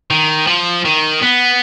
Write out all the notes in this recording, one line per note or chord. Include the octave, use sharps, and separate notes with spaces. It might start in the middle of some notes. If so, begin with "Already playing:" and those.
D#3
F3
D#3
B3